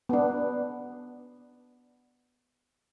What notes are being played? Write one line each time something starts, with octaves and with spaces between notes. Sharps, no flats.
B3 D4